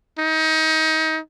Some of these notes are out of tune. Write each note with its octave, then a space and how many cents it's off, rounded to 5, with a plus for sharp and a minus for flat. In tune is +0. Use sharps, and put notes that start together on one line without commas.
D#4 +30